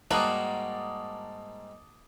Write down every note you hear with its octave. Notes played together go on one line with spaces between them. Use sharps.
G#2 G3 A#3 F#4 A5 D6 D#6